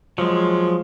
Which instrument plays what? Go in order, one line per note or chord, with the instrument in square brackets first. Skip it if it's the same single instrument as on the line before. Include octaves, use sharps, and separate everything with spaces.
[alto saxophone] F3 [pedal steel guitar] F#3 G#3